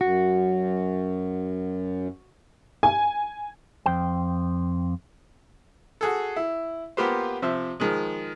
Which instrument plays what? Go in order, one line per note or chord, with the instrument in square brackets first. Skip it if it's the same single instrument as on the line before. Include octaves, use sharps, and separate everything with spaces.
[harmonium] F#2 [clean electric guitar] F#4
[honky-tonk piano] G#5
[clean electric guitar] F2 C5 G5
[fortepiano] F#4 G#4 A4
E4
A#3 B3 F4 G4 B4 C5
C3 F3 C5 E5
D#3 F3 G#3